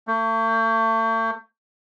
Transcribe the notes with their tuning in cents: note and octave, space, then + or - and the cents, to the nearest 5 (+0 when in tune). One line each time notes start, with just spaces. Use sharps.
A3 +40